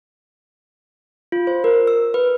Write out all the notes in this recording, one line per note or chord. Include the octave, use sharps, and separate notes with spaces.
F4
C5
A#4
E6
B4